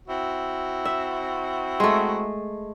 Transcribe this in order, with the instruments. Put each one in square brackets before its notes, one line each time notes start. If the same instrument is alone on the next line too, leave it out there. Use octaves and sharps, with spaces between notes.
[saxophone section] C4 E4 F#4
[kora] E5
G#3 A3